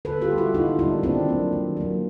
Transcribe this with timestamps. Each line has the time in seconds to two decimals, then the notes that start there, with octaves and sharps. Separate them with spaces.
0.05 D3 A4 B4
0.21 F4 G4
0.30 G3 A#3
0.38 E4 F#4
0.54 D3 D#4 F4
0.79 G3 A#3 D4 E4
1.03 D#3 C4 D4
1.28 F#3 A#3
1.53 D#3
1.77 F#3 A#3